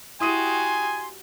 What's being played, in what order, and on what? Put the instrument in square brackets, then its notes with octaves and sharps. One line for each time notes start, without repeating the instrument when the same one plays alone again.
[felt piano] E4 D#6 D#7 [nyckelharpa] F#4 G4 [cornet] G#5 [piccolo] C6